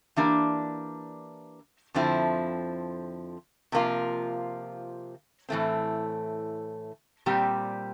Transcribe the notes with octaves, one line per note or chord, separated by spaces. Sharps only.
E3 A#3 D4 G4
F2 D3 F3 C4 E4
C3 F3 A#3 F4
A2 E3 A3 C4
A#2 G3 C4 G4